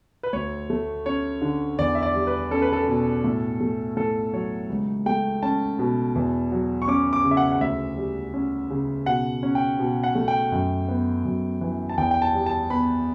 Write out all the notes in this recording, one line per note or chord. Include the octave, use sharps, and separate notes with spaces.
B4
D2 C#5
A3
C#4 C#5
D3
E2 D5
E5
D5
G3
B4
C#4 A4
B4
A4
B2
A2
A3
A2 A4
F#3 C#5
C#2
A3 G5
C#4 A5
B2
E2
F#3
C#6
C#4 D6
D6
C#3
E5
F#5
F#5
D2 E5
G3
C#4
C#3
B2 F#5
C#4
G5
B2
F#5
A3
G5
F#2
B3
F#2
E3
A5
E2 G5
G5
A5
G3
A5
B3 B5